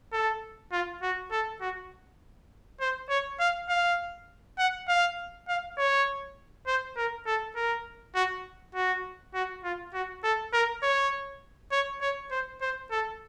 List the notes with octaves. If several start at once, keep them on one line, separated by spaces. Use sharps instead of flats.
A4
F4
F#4
A4
F#4
C5
C#5
F5
F5
F#5
F5
F5
C#5
C5
A#4
A4
A#4
F#4
F#4
F#4
F4
F#4
A4
A#4
C#5
C#5
C#5
C5
C5
A4